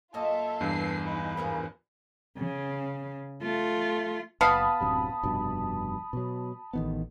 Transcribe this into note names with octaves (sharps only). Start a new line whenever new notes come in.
F#2 A#3 F4 A4 D#5 E5
E2 G2 B4 C7
G#3 D#4 B4
G#2 F3 B3 F4 G#4 A#4
C#3
A3 F4
F#1 B3 F5 A5 B5 D#6
D1 F#2 C3
F1 G2 B2
B2 F#3
A1 D#3 B3